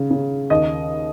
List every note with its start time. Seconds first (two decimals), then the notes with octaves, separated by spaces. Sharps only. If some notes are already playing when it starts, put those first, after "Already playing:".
Already playing: C#3
0.10 C#3
0.50 D#2 D#5